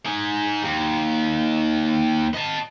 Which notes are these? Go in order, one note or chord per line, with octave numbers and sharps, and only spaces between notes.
D#4 G#5
D#2
D#5 A5